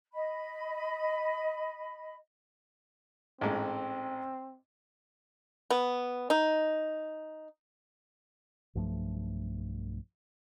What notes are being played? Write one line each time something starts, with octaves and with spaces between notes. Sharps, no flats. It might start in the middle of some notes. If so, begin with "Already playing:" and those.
D#5 B5
A1 G#2 C4
B3
D#4
B1 G2 F3 A3